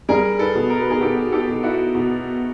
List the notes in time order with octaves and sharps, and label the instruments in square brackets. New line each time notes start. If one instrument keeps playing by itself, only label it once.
[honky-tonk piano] G3 [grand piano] G#4 A#4
[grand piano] A4 B4
[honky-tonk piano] B2
[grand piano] A#4
B4
G#4 A#4
[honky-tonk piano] B2 [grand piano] G4 A4
[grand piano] G4 A4
[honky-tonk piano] B2
[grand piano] E4 F#4
[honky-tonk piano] B2